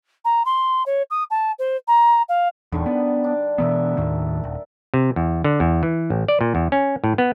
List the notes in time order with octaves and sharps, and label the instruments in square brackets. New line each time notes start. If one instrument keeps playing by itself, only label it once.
[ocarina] A#5
C6
C#5
D#6
A5
C5
A#5
F5
[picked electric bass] D#1 E2 [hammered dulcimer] D3 D#3 G3
[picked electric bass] B3 [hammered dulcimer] D5
[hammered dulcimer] D4
[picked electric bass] B2 E3 B3 [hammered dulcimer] A#4 E5
[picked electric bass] D#2 A2 D#3
D#1
[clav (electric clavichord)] C3
E2
D3
E2
E3
A1
D5
A#2
E2
C#4
A2
B3